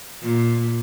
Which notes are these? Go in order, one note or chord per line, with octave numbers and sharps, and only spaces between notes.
A#2